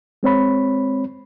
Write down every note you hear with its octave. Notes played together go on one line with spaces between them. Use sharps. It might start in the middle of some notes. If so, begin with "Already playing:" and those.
G#3 C4 C#5 B5